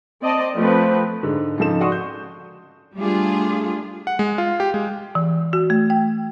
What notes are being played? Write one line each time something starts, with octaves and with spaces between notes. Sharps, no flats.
C4 D5 D#5 A5
F3 A3 C4 B4
G#2 D3
G#2 C#3 F3 D#4 A4 E7
F#4 D5 F#5 C6 C#6 D#6
G6
G3 A3 D4 F4 G#4
F#5
G#3
F4
G4
G#3
E3
F#4
A3
G5